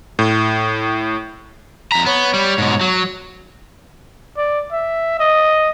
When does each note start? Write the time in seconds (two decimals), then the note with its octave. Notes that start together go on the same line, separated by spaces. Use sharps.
0.19 A2
1.92 F2 A#5 B6
2.06 B3 C#5
2.34 G3
2.58 G#2 B2
2.81 F#3
4.37 D5
4.72 E5
5.20 D#5